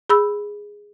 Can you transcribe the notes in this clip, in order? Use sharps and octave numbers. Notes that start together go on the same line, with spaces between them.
G#4 B5 E6